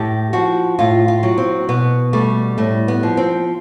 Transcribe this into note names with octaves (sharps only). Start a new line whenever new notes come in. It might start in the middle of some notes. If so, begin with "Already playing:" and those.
Already playing: A2 G4
F3 F#4
A2 F4
F4
F#3
C4
B2 B3
G3 A3
A2 A3
B3
F3
C4